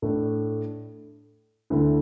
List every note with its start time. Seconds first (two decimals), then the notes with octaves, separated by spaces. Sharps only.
0.02 A2 A3 D4
1.70 D2 D3 A3 E4